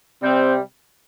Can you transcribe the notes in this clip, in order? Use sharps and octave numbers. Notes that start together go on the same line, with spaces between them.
C3 G3 C4